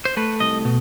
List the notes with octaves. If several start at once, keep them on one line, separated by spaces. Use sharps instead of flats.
C5
A3 B4
C2 D#5
B2